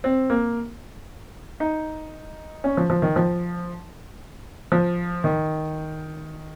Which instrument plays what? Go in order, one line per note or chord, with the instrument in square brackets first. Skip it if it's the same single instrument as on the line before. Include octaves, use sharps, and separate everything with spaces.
[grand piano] C4
A#3
D#4
C#4
F3
F3
D#3
F3
F3
D#3